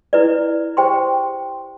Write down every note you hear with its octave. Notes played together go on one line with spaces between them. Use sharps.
E4 B4 D5
G4 C5 G5 C6